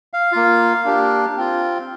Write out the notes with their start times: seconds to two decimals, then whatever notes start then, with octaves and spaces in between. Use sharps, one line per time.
0.13 F5
0.32 A#3 F4
0.84 A#3 D4 G4
1.37 C4 F4